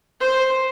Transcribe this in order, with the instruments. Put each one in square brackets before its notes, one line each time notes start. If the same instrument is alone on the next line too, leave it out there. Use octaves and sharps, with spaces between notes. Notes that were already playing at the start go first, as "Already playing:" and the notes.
[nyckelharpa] C5